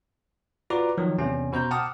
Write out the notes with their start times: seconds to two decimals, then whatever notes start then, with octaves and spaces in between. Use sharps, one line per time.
0.70 F4 F#4 B4 D5 A#5 D6
0.98 D#3 F3 F#3
1.18 E2 C3 C#4
1.52 B2 C5 A#5 G6
1.71 F#5 G5 A5 D6 D#6 F6